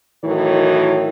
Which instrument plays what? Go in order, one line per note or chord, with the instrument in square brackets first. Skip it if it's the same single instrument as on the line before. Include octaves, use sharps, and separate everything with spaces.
[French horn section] A2 D#3 E3 F#3 F#4 C#5